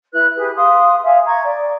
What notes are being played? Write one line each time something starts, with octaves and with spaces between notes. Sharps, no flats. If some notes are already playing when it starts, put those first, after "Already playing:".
E4 B4 F#6
G4 G#4 B4
F5 C6 D#6
E5 F5 G#5
A#5 C#6 G#6
D5